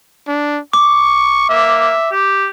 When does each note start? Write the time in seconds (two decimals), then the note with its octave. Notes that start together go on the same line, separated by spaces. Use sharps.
0.28 D4
0.73 C#6 D6
1.49 A#3 E5
2.11 G4